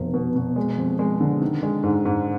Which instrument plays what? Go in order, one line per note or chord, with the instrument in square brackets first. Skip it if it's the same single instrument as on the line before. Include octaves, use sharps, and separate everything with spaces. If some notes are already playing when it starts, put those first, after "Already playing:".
Already playing: [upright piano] F1 B2
B2
B2
G#3
F2
G#3
D3
D#3
G#3
G#2
G#2